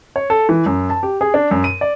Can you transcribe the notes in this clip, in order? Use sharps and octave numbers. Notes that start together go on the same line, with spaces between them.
C#5
A4
E3
F#2
A5
G4
G#4
D4
F#2
D#7
D5